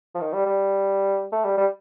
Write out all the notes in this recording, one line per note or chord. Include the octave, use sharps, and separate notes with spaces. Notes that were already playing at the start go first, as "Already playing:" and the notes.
F3
D#3
G3
G3
A3
G3
G3